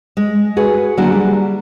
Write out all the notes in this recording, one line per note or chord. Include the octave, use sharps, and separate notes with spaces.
G#3
F#4 G#4 B4
D3 F#3 A#3 D4 E4 F#4
G3